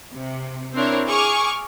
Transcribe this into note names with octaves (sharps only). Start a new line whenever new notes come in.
C3
C4 D4 E4 A#4 C#5
G#4 C#6 D6 F6